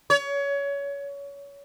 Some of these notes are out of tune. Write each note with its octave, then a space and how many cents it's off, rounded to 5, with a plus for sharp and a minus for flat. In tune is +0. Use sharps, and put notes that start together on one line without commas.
C#5 +25